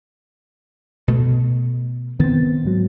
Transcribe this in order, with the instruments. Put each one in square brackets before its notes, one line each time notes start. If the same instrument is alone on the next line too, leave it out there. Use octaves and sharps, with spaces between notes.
[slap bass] B2 A3
[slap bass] D#3 C4 [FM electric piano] B3 A6
[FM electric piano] G#2 F#3